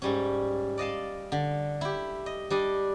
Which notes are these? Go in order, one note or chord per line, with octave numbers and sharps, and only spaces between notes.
G#2 G3 C#4
D5 D#5 F5 A5
D3
E4 G4
D#5
G3 D4 D#5